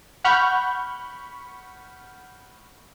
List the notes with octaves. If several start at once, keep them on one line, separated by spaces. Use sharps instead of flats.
F#5 B5 C#6 F6 G6